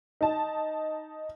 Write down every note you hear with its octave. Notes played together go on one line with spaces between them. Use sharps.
D#4 A5